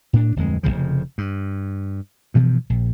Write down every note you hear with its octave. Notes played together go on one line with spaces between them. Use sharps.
A2 D4
D1 F2 G#3
F1 D#2 C#3 F3
G2
G2 B2 E3 F3
A#1